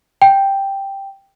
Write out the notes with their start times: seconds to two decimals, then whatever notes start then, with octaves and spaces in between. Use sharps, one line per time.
0.22 G5